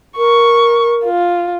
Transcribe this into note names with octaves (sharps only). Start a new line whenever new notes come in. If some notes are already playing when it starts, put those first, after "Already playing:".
A#4 C#6
F4